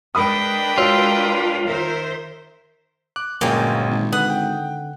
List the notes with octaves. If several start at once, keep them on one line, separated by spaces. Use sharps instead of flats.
G#3 D4 A#4 B4 G5 B5 D#6
F4 F#4 C#5 E6
D#3 A#4 C5 E5
D6 F#6
G1 A#2 F#3 G#3 A#3 C#4 G5
G#1
D3 B4 F#5 D#6
G5